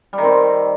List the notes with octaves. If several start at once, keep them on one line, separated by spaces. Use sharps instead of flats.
G3
D#3
C4